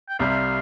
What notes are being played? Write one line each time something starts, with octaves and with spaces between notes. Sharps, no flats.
G5
C2 C3 G3 F5